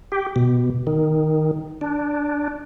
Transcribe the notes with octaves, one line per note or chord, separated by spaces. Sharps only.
G4
B2
D#3
D4